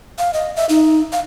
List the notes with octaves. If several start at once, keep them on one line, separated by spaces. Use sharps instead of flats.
F5
D#5
E5
D#4
F5